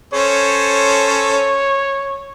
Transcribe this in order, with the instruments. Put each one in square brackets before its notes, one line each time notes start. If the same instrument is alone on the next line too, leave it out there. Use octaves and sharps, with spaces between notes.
[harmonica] C#4 A4 C5 [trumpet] C#5